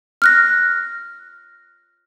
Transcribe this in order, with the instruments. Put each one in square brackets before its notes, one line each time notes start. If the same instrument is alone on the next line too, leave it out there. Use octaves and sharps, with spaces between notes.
[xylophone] F6 F#6 A#6